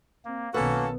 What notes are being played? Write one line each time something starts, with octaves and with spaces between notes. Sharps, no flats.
A#3 C4
B1 D#3 A#3 B3 C#4 F#4 A4 B4